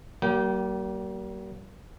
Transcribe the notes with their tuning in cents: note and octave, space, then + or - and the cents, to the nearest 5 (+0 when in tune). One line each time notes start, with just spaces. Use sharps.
G3 -45 A#3 +5 G5 -25